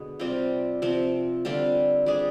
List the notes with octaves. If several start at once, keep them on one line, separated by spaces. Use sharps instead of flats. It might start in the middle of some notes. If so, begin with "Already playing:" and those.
Already playing: B2 D3 G#3 B3 G#4
C3 G3 C4 F4
C3 F3 C4
D3 G3 C4 F4
G3 D4 G#4